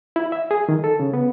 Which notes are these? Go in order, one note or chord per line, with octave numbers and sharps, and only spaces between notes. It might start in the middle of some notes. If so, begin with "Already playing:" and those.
E4
E5
G#4
D#3
A4
C#3
B3